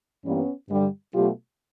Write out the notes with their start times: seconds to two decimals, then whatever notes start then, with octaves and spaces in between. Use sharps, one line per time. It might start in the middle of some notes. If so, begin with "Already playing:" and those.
0.25 G2 E3 G3 A#3 B3 C#4
0.70 G2 D3 G3
1.14 B2 F#3 A3 F4 G4